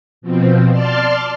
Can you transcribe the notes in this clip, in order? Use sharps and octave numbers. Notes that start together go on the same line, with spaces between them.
B2 F3 C4
D5 A5 C6 F6